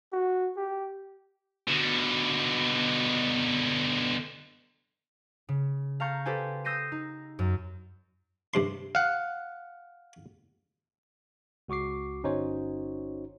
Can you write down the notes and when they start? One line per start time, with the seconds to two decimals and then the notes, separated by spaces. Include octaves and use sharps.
0.12 F#4
0.57 G4
1.67 B2 D3
5.49 C#3
6.00 F5 A5 A#5 C#6 G6
6.26 G4 A4 B4 C5 G#5
6.65 D#6 E6 G6 A#6 C7 D#7
6.92 D#4
7.39 F#2
8.54 G2 C3 C6
8.95 F5 F#5
11.68 C#2 F#4 C#6 D6 C7
12.24 G1 C#4 D#4 F#4 C5 C#5